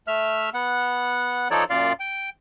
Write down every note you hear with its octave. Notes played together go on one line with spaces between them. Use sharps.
A3 E5 F6
B3 F#5
F3 D#4 A4 C#5 D5
F#2 A#2 F4 D5 F5
G5